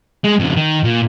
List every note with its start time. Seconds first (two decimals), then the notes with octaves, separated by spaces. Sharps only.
0.24 G#3
0.39 F2 C#3
0.57 D#3
0.84 A#2